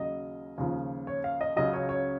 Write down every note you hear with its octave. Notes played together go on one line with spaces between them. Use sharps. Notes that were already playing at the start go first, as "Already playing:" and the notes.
Already playing: D#2 C#3 F#3 D#5
D#2 C#3 F3
C#5
F5
D#5
C#2 C#3 F#3 D#5
C#5
C#5